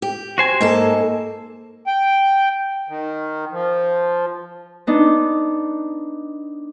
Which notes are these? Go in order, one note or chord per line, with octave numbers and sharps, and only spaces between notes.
G4
F#4 C5 G#5
G#2 A#3 A4 A5
G5
D#3
F3
B3 D4 D#4